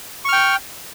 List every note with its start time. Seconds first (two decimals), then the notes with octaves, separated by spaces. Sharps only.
0.25 C#6
0.29 F6
0.33 G5